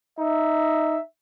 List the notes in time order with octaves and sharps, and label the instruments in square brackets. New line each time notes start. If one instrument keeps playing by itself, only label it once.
[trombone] D#4 [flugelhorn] E5